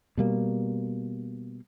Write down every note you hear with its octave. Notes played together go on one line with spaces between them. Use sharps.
B2 G3 A#3